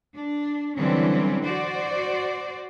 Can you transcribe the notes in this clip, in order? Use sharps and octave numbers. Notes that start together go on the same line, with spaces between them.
D4
D3 E3 F#3 G3 C4 C#4
F#4 C5 D5